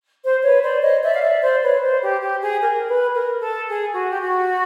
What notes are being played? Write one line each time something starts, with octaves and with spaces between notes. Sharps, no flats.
C5
B4 C#5
C5 D5
C#5 D#5
D5 E5
F5
D5 E5
C5 D5
B4 C#5
C5
G4
G4
G#4
A#4
B4
A#4
A4
G#4
F#4
G4
F#4